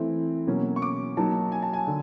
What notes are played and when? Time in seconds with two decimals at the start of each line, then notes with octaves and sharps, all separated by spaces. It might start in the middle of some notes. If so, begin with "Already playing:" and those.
Already playing: E3 A3 C4 E4
0.47 B2 F#3 A#3 C#4
0.76 C#6
0.82 D6
1.17 F#3 A#3 D#4 A5
1.52 G#5
1.63 A5
1.73 G#5
1.87 D3